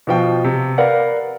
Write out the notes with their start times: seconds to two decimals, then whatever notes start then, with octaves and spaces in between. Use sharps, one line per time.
0.07 B2 F3 G5
0.44 C3
0.78 A#4 B4 D5 F5 F#5